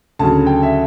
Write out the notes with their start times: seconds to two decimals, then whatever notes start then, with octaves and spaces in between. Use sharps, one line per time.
0.19 D2 C#3 F#3 A5
0.46 G5
0.63 E5